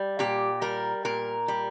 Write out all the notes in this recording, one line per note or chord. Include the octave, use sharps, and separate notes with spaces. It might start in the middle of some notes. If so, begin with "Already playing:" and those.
Already playing: G3
A#2 G4
G3 A#4
A#2 A#4
G3